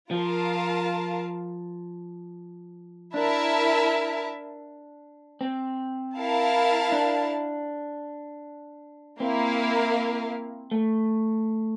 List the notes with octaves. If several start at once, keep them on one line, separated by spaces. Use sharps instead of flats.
F3 F4 A#4 F5 A5
D4 E4 A#4 E5 A5
C4
E4 A#4 F5 A5
D4
A#3 C4 E4 A#4 F5
A3